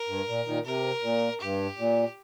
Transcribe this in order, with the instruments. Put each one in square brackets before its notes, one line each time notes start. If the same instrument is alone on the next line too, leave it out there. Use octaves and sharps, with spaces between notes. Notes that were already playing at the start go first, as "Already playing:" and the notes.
Already playing: [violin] A#4
[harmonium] G2
A#2
A#2 D#3
[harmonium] C3 [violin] A#4
[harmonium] A#2
[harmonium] G2 [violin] G4
[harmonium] A#2